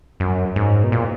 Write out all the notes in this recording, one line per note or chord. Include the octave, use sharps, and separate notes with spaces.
F#2
G#2
B2
A#2